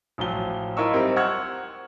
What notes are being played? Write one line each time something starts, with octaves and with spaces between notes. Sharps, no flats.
A1 F3 F#3 G7
E4 F4 A#4 D#5 C#6 E6
G3 C4 D#4 A#4
F#5 C#6 E6 F6 G#6